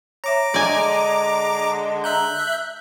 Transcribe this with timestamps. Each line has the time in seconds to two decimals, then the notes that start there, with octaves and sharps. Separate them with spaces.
0.24 C#5 E5 A#5 D6
0.54 D3 G#3 D5 G#5
2.04 E5 A#5 F#6 G6